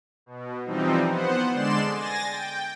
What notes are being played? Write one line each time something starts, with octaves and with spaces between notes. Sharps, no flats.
B2
E3 F3 G3 C4 D#4
B3 C5 F#5
D3 G#3 D5 C6 E7
G#5 A6 A#6
G5